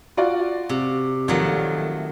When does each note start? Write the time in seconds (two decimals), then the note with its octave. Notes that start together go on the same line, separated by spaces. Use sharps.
0.17 F4 F#4 D5
0.69 C3
1.28 A#1 D#3 F#3 A3